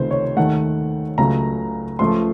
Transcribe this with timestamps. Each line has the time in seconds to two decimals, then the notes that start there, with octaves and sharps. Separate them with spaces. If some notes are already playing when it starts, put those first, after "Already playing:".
Already playing: C#2 C3 D#3 A3 C5
0.11 C#5
0.37 D#2 D#3 A3 F#5
1.18 C#2 C#3 F#3 A3 A#5
1.99 C#2 C#3 F3 A3 C6